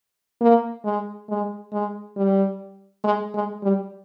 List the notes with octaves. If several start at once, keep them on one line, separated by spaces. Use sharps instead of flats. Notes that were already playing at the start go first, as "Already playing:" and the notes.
A#3
G#3
G#3
G#3
G3
G#3
G#3
G3